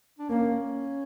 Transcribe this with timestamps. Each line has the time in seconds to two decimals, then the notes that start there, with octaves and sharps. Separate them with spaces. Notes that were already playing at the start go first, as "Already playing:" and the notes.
0.19 D4
0.29 A#3 C#4